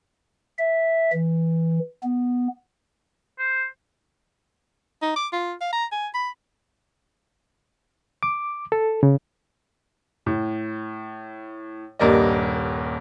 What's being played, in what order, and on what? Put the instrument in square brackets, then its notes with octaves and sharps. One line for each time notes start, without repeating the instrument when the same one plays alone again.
[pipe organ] E5
E3
B3
[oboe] C5
[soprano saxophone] D#4
D6
F4
F5
A#5
G#5
B5
[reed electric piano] D6
A4
C#3
[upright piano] A2
D#1 G2 A#3 A#4 D5 D#5